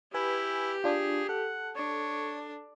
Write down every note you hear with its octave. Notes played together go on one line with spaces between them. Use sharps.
E4 G4 B4 G#5
D4 F4 G#4
A4 F#5
D4 C#5